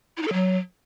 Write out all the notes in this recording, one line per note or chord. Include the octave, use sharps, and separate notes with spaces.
E4
D#4
A4
F#3